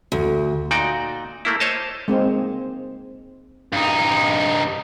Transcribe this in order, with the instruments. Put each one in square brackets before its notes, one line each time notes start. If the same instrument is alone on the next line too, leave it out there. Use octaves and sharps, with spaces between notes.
[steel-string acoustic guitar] D2
[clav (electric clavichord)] A#2 D#4 F#4 D5 G5
A3 A#3 E4
C5 C#5 D#5 A5
[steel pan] G#3 A#3 C4
[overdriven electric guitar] G2 D#4